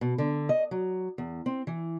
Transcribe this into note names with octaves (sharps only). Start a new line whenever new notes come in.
B2
D3
D#5
F#3
E2
C4
E3